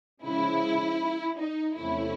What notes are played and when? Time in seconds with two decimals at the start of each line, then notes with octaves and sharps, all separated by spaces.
0.24 C#3 F3 G#3 E4
1.38 D#4
1.75 E2 C3 F3 A3 C#4 E4